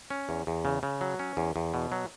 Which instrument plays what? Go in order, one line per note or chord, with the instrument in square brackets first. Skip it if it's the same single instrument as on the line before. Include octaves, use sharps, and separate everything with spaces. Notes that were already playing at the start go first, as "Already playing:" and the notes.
[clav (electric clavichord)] C#4
E2
E2
C#3
C#3
F#3
C#4
E2
E2
B2
F#3